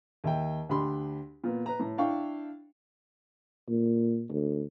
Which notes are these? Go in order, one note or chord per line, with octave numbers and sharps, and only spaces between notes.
D#2 E5 G5
D2 D4 G4 B5 C6
A#2 B3
B4 A#5
A2
D4 E4 F5 G5 C#6
A#2
D2